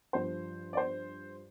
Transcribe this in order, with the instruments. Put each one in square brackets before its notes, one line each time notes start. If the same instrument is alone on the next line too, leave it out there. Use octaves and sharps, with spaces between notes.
[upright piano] G2 F3 C5
D5
C5